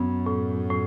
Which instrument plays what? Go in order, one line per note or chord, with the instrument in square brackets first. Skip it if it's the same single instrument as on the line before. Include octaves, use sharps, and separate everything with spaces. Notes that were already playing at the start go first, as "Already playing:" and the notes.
Already playing: [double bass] F#2 [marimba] B3
[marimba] A2
A2